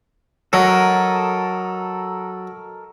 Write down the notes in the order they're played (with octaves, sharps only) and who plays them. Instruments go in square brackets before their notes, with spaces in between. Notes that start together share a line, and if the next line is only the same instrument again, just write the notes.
[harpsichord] F#3 [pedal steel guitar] A4 A#4 D#5